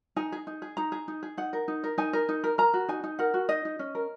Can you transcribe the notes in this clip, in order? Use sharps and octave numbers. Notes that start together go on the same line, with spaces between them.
D#4 G#5
G#4
D#4
G#4
D#4 A#5
G#4
D#4
G#4
D#4 F#5
A#4
D#4
A#4
D#4 G#5
A#4
D#4
A#4
A#4 A#5
F#4
D#4 G#5
D#4
A#4 F#5
F#4
D#4 D#5
D#4
C#4
A#4